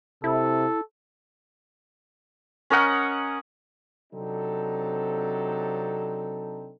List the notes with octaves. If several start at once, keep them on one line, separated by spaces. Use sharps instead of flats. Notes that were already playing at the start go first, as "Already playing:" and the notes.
C3 E4 A4
C#4 A#4 D#5 F#5
C3 F#3 C4 D4 D#4 A4